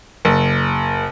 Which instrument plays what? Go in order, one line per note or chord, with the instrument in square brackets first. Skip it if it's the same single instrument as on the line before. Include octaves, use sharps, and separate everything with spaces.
[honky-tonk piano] F#1